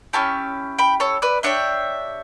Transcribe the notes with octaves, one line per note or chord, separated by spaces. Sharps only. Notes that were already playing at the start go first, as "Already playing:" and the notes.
C#4 E4 G4 A5 C#6
G5 B5
A4 C#5
B4 D5
D4 G4 C#5 E5